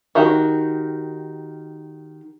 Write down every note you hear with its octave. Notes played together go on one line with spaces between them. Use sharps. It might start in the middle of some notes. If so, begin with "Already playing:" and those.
D#3 F#4 G4